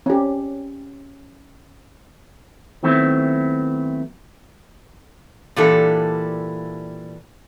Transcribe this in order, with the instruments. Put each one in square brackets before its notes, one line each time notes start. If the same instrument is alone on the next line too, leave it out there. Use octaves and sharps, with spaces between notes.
[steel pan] C#4 G4
[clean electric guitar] D#3 F#3 A3 B3 C4 E4
[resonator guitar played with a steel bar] A#2 E3 G3 D4 A4